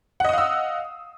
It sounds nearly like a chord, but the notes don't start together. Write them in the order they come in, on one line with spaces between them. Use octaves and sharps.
F#5 D#5 D#6 F5 E6